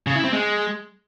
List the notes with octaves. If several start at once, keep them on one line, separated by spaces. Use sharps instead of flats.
C#3
E4
C4
G#3